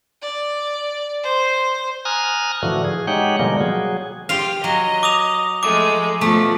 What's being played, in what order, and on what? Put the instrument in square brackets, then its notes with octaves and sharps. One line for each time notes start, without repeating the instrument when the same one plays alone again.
[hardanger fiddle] D5
C5
[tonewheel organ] G#5 A#5 D#6 F6 F#6
A2 D3 E3 F3 F#4
G#4
G#3 D#4 G4 C#5 F#5 G5
B2 D3 F3 G3 G#3 A#3
F#3 G#4
[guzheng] F4 F5 [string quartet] G4
[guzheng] F#3 [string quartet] D#5
[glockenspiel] D6 D#6 F7
[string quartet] F3 G#3 A3 [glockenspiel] D6
[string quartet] B2 F3 [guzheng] A3